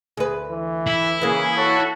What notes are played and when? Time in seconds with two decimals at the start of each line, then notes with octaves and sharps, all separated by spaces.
0.17 D2 G#4 B4
0.50 E3
0.87 E4
1.22 C#3 E3 A#3 G#4
1.57 F#4 A4 C#5